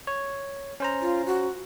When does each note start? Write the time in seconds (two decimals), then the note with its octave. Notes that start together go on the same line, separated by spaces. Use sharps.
0.07 C#5
0.80 C#4 C5 A#5
1.01 F4
1.26 F#4